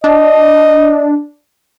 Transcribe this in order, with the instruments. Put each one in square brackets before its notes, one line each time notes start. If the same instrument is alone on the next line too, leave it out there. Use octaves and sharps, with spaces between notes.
[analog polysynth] D4 [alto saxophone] D#5